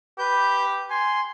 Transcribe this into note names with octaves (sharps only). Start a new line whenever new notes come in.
G4 B4 G6
G#5 C6